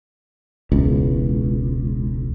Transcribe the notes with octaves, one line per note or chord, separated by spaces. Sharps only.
E1 C#2